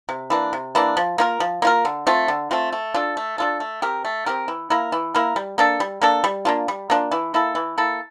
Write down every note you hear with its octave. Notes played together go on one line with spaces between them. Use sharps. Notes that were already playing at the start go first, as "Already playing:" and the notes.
C3
E3 A#3 D4
C3
E3 A#3 D4
F3
A#3 F4 A#4
F3
A#3 F4 A#4
D3
A3 C4 F4
D3
A3 C4 F4
A3
D4 F4 A4
A3
D4 F4 A4
A3
C4 G4 A#4
A3
C4 G4 A#4
E3
A#3 E4 A#4
E3
A#3 E4 A#4
G3
A#3 D4 A4
G3
A#3 D4 A4
G3
A#3 D4 F4
G3
A#3 D4 F4
E3
A#3 E4 A4
E3
A#3 E4 A4